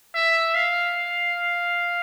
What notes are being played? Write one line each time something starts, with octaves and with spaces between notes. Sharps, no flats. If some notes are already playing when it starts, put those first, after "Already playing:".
E5
F5